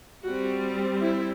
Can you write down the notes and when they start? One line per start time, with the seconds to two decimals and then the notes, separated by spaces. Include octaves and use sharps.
0.25 G3 C4 F#4
1.01 E4